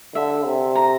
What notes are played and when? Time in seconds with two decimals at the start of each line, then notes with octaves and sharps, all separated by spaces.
0.15 D3 E5
0.45 C3
0.75 A#5